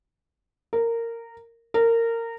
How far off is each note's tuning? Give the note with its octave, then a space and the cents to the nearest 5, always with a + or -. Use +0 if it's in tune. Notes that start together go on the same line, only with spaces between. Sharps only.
A#4 -15
A#4 -20